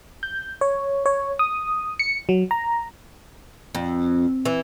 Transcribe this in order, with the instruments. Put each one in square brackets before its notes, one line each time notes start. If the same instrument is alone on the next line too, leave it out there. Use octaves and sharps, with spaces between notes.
[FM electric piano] G6
C#5
C#5
D#6
C#7
F#3
A#5
[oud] F2
E3